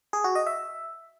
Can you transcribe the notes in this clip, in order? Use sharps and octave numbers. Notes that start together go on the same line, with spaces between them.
G#4
F#4
D#5
E5